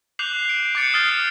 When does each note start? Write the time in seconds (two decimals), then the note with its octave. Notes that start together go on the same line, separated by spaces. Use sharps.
0.19 D6 F#6 G6 C7 F7 F#7
0.49 D7
0.75 D6 G6 A6 C#7 D7
0.94 D#6 F6 G6 A6 C7